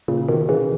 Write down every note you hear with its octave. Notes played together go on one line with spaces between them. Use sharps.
A#2 C#3
B2 D#3
C#3 E3